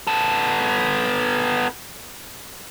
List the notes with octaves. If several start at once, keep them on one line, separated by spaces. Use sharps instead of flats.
B3 A4